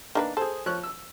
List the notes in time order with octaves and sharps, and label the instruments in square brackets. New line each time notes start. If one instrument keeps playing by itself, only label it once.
[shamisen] D#3 A#3 B4 [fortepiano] D4
[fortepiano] G#4 C5 [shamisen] A4
[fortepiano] F3 C#5 F#6
E6